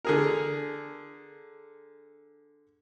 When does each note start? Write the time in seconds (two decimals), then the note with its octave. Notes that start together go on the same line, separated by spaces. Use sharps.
0.05 D3 G#4 A#4